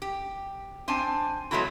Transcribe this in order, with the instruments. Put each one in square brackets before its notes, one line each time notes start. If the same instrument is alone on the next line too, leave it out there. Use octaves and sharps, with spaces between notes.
[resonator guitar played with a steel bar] G4
C4 D4 G#5 A5
F#3 G#3 A3 B3 E4 F#4